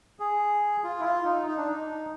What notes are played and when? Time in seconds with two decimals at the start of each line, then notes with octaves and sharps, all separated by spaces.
0.19 G#4
0.84 F4
1.00 E4
1.05 F4
1.25 D#4
1.47 D#4
1.57 D4
1.67 D#4